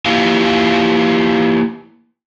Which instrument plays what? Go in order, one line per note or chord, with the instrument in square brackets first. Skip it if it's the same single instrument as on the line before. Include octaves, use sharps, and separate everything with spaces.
[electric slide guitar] A#3 E4 F4 G4 F5